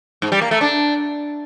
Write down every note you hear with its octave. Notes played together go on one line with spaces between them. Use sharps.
G#2
G3
A#3
A3
D4